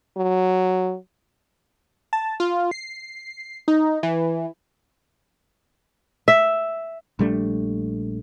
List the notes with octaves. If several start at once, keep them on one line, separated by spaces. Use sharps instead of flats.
F#3
A5
F4
C7
D#4
E3
E5
A#1 G3 A3 D4